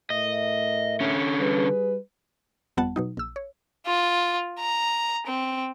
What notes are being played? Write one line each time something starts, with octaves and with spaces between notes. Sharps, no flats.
A2 A#4 D#5 E5
D3 C#4
G3 G#4 B4
G1 F2 G3 B3 F#5 A5
B2 F#3 D#4
A#1 E6
C#5
F4
A#5
C4